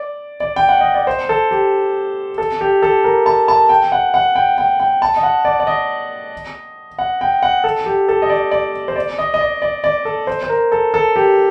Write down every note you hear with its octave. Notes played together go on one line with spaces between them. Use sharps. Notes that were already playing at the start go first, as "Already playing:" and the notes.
Already playing: D5
D5
G5
F#5
D#5
D5
C5
A4
G4
A4
G4
A4
A#4
A5
A5
G5
F#5
F#5
G5
G5
G5
A5
D#5
F#5
D5
D5
D#5
F#5
G5
F#5
A4
G4
A4
D#5
D5
D5
C5
D5
D#5
D#5
D5
D5
D5
A4
C5
C5
A#4
A4
A4
G4